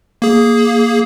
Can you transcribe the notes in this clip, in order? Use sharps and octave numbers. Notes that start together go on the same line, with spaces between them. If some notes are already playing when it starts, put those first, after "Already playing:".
A#3 G#4